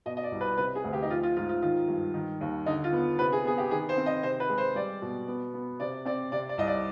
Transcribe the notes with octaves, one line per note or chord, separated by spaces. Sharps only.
B2 D#5
D#5
D5
C2
B4
C3 B4
G#4
D2
G4
D#4
F3 F4
F4
G#2 F4
F4
D#3 F4
G2
D#3
D#2
D3 D#4
F4
B3
C3 B4
G#4
B3 G#4
G4
D#3 G#4
C5
C4
D#5
C3 C5
B4
G#3
C5
G3 D5
B2
B3
B3
C3 D5
C4 D5
C3 D5
D5
C2 D#5
D5